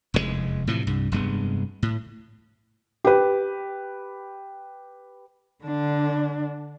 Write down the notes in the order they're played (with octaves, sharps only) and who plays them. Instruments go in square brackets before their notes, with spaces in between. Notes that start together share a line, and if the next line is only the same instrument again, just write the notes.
[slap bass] F1 E2 B2 G#3
A2 C3 E3 F3
C2 G2
F1 G2 G#3 B3
A2
[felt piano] G4 B4
[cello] D3 D4